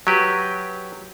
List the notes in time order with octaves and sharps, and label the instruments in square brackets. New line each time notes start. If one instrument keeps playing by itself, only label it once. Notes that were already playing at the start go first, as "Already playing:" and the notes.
[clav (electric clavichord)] F#3 G4 B4